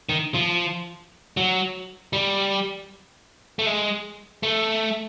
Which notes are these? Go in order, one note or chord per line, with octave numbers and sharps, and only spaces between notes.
D#3
F3
F#3
G3
A3
G#3
A3